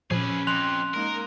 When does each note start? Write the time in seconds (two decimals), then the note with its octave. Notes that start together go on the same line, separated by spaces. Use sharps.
0.11 A#2 F3 C#4 G#4 B4
0.47 F2 C6 F#6 F7
0.94 G#3 A#3 D#4 A#4